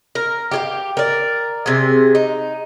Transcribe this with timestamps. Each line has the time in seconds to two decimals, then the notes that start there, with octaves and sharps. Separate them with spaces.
0.15 A#4
0.51 G4 G#4 F5
0.97 A#4 D5
1.66 C3 G#4
2.15 D#4